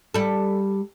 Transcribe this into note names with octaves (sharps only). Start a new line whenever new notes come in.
G3 A4